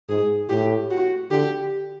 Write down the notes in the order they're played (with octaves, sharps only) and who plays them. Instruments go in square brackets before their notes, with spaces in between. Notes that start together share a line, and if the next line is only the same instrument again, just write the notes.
[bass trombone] G#2 [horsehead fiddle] G#4
[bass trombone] A2 [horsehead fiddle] G4
[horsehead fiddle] F#4
[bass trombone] D3 [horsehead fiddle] G4